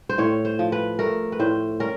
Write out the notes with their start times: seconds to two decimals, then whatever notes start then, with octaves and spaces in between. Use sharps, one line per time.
0.09 C5
0.18 A2 C#5
0.45 C5
0.59 F3
0.72 B4
0.99 A3 A#4
1.32 B4
1.40 A2 C5
1.80 C#4 A#4